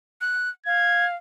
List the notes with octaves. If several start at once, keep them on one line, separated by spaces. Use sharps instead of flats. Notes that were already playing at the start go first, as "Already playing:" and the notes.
F#6
F5 G#6